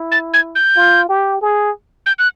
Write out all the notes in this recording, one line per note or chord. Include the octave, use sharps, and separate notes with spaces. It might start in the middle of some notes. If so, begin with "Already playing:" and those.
Already playing: E4
A6
G#6
G6
F4
G4
G#4
G6
F#6